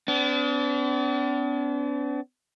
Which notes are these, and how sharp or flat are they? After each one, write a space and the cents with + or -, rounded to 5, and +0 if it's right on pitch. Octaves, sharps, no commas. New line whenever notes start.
B3 +45 D4 -40